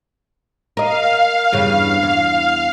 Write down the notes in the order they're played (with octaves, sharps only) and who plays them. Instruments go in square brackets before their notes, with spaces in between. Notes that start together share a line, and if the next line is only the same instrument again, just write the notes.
[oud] A#4 D#5 [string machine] F5
[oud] E2 G2 C#3
E2